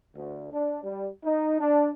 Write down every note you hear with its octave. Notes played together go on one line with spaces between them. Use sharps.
D2
D4
G3
D#4
D4